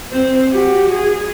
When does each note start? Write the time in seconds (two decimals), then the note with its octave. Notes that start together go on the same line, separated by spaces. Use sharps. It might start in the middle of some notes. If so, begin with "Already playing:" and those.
0.12 C4 C5
0.52 F#4 G4
0.93 G#4